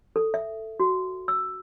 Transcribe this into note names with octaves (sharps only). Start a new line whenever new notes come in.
A4
E5
F#4
E6